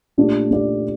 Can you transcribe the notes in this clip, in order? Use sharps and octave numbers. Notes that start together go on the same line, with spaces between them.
A#2 A3 D4 G4 D5
A#2 A3 D4 G4 D5